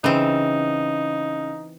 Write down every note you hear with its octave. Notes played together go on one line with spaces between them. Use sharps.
C#3 E3 C4 D#4